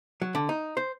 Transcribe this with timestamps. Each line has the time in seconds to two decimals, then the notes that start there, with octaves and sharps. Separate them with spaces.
0.22 F#3
0.35 D3
0.49 D#4
0.77 C5